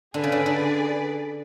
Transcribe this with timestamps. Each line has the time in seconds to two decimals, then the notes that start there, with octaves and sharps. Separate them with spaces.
0.14 D3 G#4 B4 D5
0.24 C#3
0.32 D3
0.46 D3